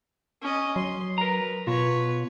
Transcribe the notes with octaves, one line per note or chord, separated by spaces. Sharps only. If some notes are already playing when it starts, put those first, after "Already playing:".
C#4 D#5
F#3 C6
A#4 B4 A#5
B2 F4 B4 C#5